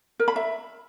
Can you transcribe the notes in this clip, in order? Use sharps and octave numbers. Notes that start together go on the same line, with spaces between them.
A#4
B5
E5